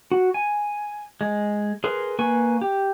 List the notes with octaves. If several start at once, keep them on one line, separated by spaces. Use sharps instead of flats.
F#4
G#5
G#3
G#4 A#4 B4 C6
A#3 B4 G#5 C#6
G4